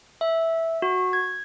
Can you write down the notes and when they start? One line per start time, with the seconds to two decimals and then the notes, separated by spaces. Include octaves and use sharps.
0.21 E5
0.82 F#4
1.13 G#6